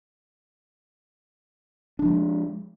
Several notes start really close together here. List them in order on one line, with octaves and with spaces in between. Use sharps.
D4 E3 F3 G#3